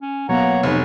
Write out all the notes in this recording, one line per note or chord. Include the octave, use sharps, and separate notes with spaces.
C#4
B2 F#3 A#3 B3 C#5 F#5 A#5
F1 D#4 B4